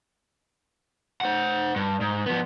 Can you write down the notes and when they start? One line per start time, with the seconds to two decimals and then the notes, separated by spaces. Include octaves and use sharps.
1.21 C5 F#5
1.76 G2
2.01 G#2
2.26 F3 B3